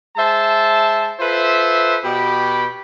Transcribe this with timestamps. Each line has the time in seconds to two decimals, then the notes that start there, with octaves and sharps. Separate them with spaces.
0.17 G#3 C5 E5 A5
1.20 F4 A4 B4 C5 E5
2.04 B2 G4 B5